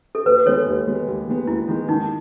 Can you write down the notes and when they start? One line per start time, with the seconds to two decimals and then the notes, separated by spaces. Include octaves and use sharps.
0.15 A4
0.26 D#2 B4
0.46 D#3 G#3 B3 A4 C#5
0.67 D#2
0.86 D#3 G#3 B3
1.08 D#2
1.27 D#3 G#3 B3
1.47 D#2 E4
1.68 D#3 G#3 B3
1.88 D#3 D#4